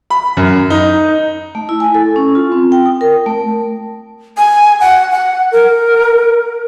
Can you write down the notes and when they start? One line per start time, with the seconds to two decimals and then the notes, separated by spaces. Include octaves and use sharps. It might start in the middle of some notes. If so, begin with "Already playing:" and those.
0.10 B5
0.37 F#2
0.70 D#4
1.55 A3
1.69 E4
1.80 G#5
1.95 A4
2.16 C#4
2.35 F4
2.52 C4
2.72 G5
2.86 D#6
3.01 A#4
3.26 A3
4.38 G#5
4.80 F#5
5.12 F#5
5.52 A#4